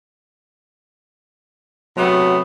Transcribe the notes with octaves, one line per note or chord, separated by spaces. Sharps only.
C3 F#3 A3 B3